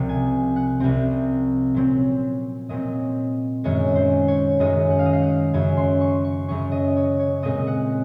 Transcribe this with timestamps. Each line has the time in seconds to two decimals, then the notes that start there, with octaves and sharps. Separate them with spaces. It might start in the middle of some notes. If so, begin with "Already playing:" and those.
Already playing: C2 C3 F3 C4 F#5
0.09 G#5
0.56 F#5
0.80 C2 C3 F3 C4
1.74 A#2 F#3 C4
2.69 A#2 F#3 C4 D#5
3.64 F#2 D#3 G#3 C#5
3.95 C5
4.28 C#5
4.59 F#2 D#3 G#3 D#5
4.90 F#5
4.99 F5
5.06 D#5
5.13 F5
5.22 F#5
5.53 F#2 C#3 F#3 C#4 G#5
5.77 C6
6.01 C#6
6.24 C#6
6.48 F#2 C#3 F#3 C#4 C#6
6.72 D#5
6.97 C#5
7.19 C#5
7.42 A#2 G#3 C4 D#5
7.67 F#5